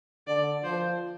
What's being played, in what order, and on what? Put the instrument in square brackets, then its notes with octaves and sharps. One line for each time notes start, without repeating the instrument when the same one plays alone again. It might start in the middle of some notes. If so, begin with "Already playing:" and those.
[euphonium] D3 [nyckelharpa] D5
[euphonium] F3 [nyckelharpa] C5